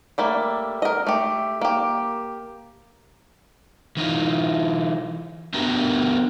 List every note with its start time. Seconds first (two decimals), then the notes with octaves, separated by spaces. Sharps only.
0.18 G3 A3 A#3
0.82 A#4 D#5
1.07 A3 G4
1.61 A#3 G4
3.97 E3 D#4 F4
5.54 B3 D4 F#4 G4 A#4 A#5